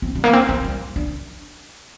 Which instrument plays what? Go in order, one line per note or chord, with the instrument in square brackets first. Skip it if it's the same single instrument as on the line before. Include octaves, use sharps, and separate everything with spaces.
[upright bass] C4
G3
A#3
C4
C4
G3
D4